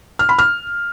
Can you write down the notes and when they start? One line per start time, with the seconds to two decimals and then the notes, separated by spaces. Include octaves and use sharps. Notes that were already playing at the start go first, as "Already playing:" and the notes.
0.19 F6
0.29 B5
0.39 F6